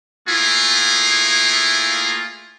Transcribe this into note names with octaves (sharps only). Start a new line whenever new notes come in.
A3 A#3 E4 F4 G#4